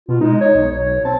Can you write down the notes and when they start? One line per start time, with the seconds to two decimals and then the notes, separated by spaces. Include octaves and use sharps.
0.09 B2 F4
0.21 G#3 D#4
0.41 D#4 C#5
0.55 B1
0.71 B1 C#5
1.05 C4 A5